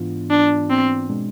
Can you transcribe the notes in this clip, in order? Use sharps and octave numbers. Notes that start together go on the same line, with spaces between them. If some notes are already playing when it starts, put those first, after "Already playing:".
Already playing: G#2 E3 B3 D4 F4
D4
C4
B2 G#3 D4